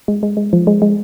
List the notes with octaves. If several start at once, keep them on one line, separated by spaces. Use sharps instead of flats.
G#3
G#3
G#3
F3
G#3
G#3